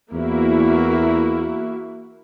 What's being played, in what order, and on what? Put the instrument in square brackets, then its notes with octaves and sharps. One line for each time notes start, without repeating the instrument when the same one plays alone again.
[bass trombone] E2 [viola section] A#3 E4 F#4